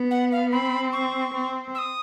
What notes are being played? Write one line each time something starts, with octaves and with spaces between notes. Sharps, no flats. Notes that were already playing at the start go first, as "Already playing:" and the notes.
Already playing: B3
F#5
F5
C4 B5
C#6
C4
E6
D#6